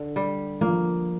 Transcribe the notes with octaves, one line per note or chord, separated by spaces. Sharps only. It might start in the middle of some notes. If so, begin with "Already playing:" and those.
Already playing: D3
G3
F3 A#3